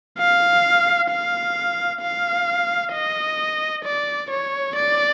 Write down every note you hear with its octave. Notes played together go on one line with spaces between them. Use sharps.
F5
F5
F5
D#5
D5
C#5
D5